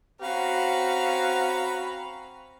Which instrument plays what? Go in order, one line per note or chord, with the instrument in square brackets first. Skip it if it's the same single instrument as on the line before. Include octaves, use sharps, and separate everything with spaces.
[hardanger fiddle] C4 F5 [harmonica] C#4 A#5 B5 [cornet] F#4